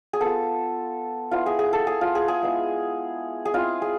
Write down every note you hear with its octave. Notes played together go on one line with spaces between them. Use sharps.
G#4
B3 F4 A4
B3 E4 F4
G#4
G#4
A4
G#4
F4
G#4
G#4
G#3 B3 E4
G#4
G#3 C4 E4 F4
G#4